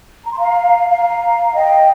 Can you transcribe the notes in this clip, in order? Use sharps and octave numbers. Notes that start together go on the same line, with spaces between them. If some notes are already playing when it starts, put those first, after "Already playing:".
A#5
C6
F5 A#5
F5 A#5
D#5 G5